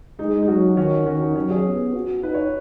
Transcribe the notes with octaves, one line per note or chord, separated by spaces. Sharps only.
G#3 D#4
D#4
F#3 C#4 F#4
D#3 C#4 F#4
D#3 C#4 F#4
D#4
F#3 C#4
G#4 C#5
B3
F#4
D#4 B4
C#5